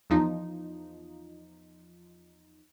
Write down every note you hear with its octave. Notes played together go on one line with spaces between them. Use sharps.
E2 F3 D#4